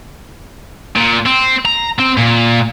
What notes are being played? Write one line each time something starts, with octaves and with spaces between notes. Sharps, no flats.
A#2
C4
A#5
C4
A#2